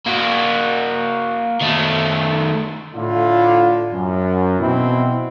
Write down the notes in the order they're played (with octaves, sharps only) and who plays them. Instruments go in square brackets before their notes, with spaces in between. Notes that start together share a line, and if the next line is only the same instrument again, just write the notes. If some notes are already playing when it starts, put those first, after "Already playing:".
[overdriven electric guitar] A#3 F#4
D#3 A3
[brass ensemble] A2 D3 E4 F4
F#2
B2 E3 C4 E4